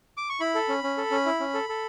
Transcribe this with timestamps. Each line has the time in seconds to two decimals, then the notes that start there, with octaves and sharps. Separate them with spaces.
0.17 D6
0.29 C#6
0.40 E4 B5
0.55 A4
0.69 C#4
0.84 C#4
0.98 A4
1.11 C#4
1.26 E4
1.40 C#4
1.54 A4
1.69 A4